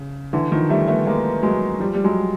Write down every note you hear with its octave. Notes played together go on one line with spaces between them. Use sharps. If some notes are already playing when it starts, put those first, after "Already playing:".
Already playing: C#3
D3 E3
D#3 F3
G3 A3
A3 B3
G#3 A#3
F#3 G#3
F3 G3
G3
F#3 G#3